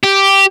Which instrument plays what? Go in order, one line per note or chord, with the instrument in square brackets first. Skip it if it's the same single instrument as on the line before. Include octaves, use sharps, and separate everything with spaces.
[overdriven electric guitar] G4